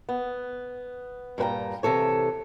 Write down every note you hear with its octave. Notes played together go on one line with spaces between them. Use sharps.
B3
G2 A#2 B4 G5 A#5
C3 E3 A4 C#5